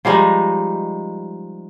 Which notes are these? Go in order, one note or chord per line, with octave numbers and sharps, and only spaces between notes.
F3 G3 G#3 D#4